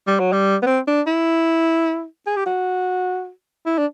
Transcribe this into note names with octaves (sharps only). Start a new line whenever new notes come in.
G3
F#3
G3
B3
C4
D4
E4
G#4
G4
F#4
E4
D4